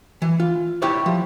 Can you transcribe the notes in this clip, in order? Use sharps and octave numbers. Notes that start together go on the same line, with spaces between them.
E3
F4
E4 G4 C#5 D5 E5
F3